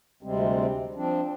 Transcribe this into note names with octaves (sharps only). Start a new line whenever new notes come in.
D2 C3 G3 G#3 C4
F3 C4 D4